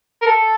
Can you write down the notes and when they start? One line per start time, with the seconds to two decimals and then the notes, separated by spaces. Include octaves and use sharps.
0.22 A#4
0.26 A4